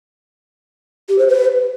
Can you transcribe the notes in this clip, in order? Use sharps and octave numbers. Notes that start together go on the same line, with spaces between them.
G4
C5
B4